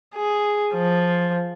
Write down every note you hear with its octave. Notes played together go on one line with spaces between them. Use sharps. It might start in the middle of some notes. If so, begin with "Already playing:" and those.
G#4
F3